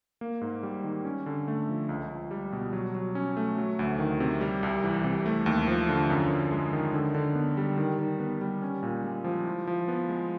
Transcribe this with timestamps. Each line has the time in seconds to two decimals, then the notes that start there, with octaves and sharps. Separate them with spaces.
0.21 A#3
0.41 G#2
0.63 G3
0.84 D#3
1.05 C#4
1.26 D3
1.48 A3
1.68 F3
1.89 C#2
2.10 C#2
2.31 G3
2.52 B2
2.73 F#3
2.95 F#3
3.15 C#4
3.37 A3
3.58 F#3
3.79 D2
3.99 D#3
4.20 C3
4.41 G3
4.63 C2
4.84 E3
5.04 C3
5.26 A3
5.46 D#2
5.68 F3
5.89 D3
6.10 F#2
6.30 F#2
6.52 G#3
6.73 D#3
6.94 D3
7.15 D3
7.35 B3
7.57 G3
7.78 D#3
7.99 D#3
8.20 B3
8.41 G3
8.62 C#4
8.83 A#2
9.03 G#3
9.24 F3
9.45 E4
9.67 F3
9.88 B3
10.09 G#3